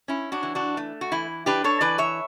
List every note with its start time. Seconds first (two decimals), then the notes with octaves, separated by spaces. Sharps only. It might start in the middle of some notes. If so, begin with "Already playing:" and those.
0.08 C#4 E4
0.32 D4 F#4
0.43 E3
0.55 D4 F#4
0.77 A3
1.01 F#4
1.12 E3 E4
1.46 D4 G4 B4
1.64 A4 C#5
1.81 E3 B4 D5
1.98 C#5 E5